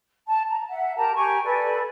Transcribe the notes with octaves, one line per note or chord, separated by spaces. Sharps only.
A5
A#5
E5 F#5
G4 A#4 A5 A#5
G4 G#5 A#5 C#6
A4 B4 D5 G#5